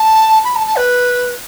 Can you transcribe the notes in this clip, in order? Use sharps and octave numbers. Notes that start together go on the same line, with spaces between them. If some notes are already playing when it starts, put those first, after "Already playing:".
Already playing: A5
B5
A5
A5
B4